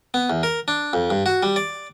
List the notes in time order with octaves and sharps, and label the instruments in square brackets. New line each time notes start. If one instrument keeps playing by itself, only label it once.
[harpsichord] B3
E2
A#4
D4
F2
G2
F#4
G3
D5